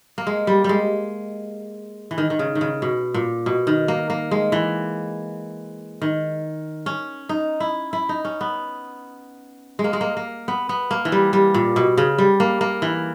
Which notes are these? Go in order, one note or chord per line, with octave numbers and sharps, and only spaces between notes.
A#3
G#3
G3
G3 G#3
E3
D#3
D#3
C#3
D#3
C#3
B2
A#2
B2
D#3
A#3
A#3
G#3
E3
D#3
C#4
D#4
E4
E4
D#4
C#4
B3
G#3
A#3
G#3
A#3
A#3
B3
B3
A#3
E3
G3
G3
A#2
B2
C#3
G3
A#3
A#3
E3